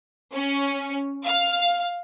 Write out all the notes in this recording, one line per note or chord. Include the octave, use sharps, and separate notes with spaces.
C#4
F5